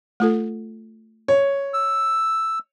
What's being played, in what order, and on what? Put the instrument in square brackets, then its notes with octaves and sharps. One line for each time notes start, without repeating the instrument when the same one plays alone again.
[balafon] A3 F4 A4
[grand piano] C#5
[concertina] E6